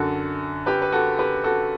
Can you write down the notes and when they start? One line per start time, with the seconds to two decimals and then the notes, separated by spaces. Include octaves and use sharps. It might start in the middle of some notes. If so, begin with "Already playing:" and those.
Already playing: F#2 D3 F#4 A4
0.66 G4 B4
0.82 B4
0.92 F#4 A4
1.19 G4 B4
1.44 F#4 A4